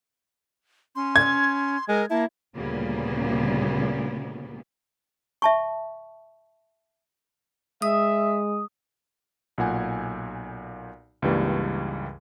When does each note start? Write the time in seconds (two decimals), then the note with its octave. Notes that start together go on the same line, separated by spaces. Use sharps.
0.96 C#4 C6
1.16 G#6
1.88 G#3 A#4
2.10 A#3 E4 A5
2.56 D2 A#2 C#3 G3 A#3 B3
5.42 E5 A5 C#6
7.82 G#3 E5 D#6
9.58 B1 A#2 F#5 G#5
11.22 C#2 G2 E3 G3 A#3